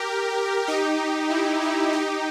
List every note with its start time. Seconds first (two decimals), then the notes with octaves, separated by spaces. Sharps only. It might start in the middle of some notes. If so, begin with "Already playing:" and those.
Already playing: G4 A#4
0.68 D#4 G4
1.30 E4
1.62 E4
1.93 D#4 G4